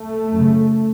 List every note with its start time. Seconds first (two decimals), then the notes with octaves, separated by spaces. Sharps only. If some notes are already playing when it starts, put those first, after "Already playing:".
Already playing: A3
0.33 F#2 C#3